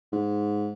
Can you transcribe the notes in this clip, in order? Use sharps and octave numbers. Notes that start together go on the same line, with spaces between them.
G#2